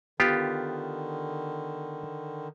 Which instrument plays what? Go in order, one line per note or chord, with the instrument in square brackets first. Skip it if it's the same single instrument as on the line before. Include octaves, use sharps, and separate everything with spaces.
[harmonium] D3 D#3 [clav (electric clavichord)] B3 F4 G4